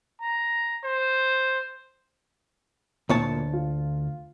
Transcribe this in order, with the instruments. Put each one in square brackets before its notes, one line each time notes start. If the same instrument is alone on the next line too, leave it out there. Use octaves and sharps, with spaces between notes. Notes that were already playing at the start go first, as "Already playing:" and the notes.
[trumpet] A#5
C5
[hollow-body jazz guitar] D2 C#5 A5 [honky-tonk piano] A#2
[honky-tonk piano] F4